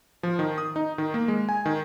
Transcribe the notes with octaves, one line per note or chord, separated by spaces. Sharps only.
F3
D#3
D#6
D#4
D#3
A#3
G#3
G#5
D#3